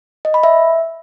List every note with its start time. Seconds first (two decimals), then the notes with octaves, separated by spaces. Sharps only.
0.25 D#5
0.34 B5
0.43 E5